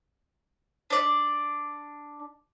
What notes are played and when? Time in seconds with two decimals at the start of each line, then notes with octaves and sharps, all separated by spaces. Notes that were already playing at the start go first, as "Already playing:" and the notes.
0.90 D4 D5